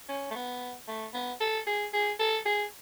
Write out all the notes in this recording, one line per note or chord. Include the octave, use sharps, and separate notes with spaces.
C#4
A3
B3
A3
B3
A4
G#4
G#4
A4
G#4